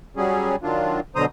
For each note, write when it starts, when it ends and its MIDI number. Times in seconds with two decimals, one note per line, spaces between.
0.17 0.56 54
0.17 0.56 55
0.17 0.56 61
0.17 0.56 68
0.63 1.00 51
0.63 1.00 54
0.63 1.00 62
0.63 1.00 65
1.15 1.26 47
1.15 1.26 50
1.15 1.26 54
1.15 1.26 72
1.15 1.26 82
1.15 1.26 87